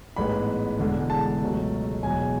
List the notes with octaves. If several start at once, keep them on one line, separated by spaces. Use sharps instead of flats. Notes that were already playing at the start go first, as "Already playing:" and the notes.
A1 G#2 G#3 B3 B5
E1 E2 D3 G#3
A5
C#2 B2 F#3 A3
E1 E2 B2 F#3 G#5